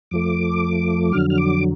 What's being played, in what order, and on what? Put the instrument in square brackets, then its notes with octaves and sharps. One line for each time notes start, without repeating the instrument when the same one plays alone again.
[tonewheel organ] F2 F3 A3 D6
F2 D3 F#3 F6
F6
D6